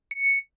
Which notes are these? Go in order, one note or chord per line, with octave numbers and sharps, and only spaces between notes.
C#7